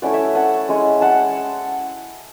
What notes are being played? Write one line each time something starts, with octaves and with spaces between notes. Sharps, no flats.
A3 C#4 E4 D5 F#5
C#5 E5
F#5 A5
G#3 C#4 E4
F#5 A5